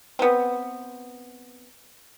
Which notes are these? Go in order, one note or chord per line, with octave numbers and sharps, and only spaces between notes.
B3 C4